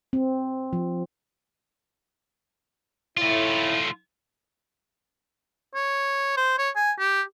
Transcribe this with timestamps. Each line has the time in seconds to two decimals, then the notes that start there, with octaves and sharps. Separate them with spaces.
0.13 C4
0.73 F3
3.17 A2 A3 E4 F4
5.75 C#5
6.37 C5
6.58 C#5
6.76 G#5
6.99 G4